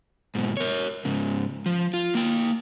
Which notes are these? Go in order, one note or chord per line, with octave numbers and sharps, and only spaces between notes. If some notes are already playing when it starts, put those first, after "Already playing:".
G#2 B2
A#4 C#5
G#2 C#3
F3
F4
A#3 G5